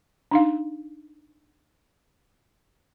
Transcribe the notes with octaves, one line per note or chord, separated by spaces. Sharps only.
D4 D#4 F5